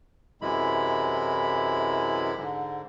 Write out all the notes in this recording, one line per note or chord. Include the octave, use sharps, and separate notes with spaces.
F#2 C3 E3 G#3 E4 B5
G#2 D3